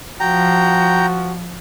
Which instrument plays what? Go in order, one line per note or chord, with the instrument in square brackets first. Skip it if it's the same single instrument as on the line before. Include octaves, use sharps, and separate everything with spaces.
[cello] F3 [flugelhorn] F#4 [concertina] G5 A#5